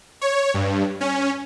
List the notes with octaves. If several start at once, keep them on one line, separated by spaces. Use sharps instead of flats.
C#5
G2
C#4